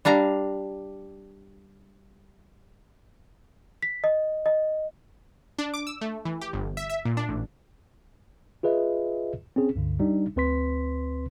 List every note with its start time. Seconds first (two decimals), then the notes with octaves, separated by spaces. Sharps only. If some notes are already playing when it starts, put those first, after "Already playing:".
0.05 G3 D4 F5 A#5
3.83 B6
4.04 D#5
4.46 D#5
5.59 D4
5.74 D6
5.87 E6
6.01 A3
6.25 E3
6.41 G4
6.53 G1
6.77 E5
6.90 E5
7.05 A#2
7.17 D4
7.29 A1
8.63 F4 G#4 B4 D#5 E5
9.56 C4 C#4 G#4
9.76 C#2 G2 D3
10.00 G3 D4 D#4
10.36 D2 C4 B4 C6 B6